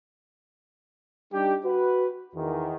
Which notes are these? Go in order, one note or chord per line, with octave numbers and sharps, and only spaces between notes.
G3 D4 D#4 G4
F#4 B4
E2 D#3